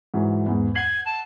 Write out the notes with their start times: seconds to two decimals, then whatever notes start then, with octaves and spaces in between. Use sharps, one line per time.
0.14 G#2 E3 F#3
0.46 E2 G#2
0.75 F#5 G#6 C7 F#7
1.06 A5